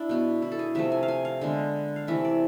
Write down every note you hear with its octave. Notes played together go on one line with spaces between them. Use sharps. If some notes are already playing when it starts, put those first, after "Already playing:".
Already playing: D4 E4
B2 B3
E4
A4
G#4
C3 F3 A3 E5
G#5
F5
G#5
F5
D3 G#3 B3
F5
C3 E3 A3 E5
D5